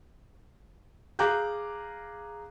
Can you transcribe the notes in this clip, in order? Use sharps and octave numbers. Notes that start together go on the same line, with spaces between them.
G#4 F5 A#5 D6 F#6 G6